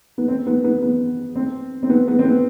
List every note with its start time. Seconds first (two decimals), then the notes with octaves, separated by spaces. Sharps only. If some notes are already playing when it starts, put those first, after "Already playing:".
0.18 B3
0.28 C4
0.46 B3
0.64 B3
0.82 B3
1.36 C4
1.83 C4
1.89 B3
2.08 B3
2.19 C4
2.25 B3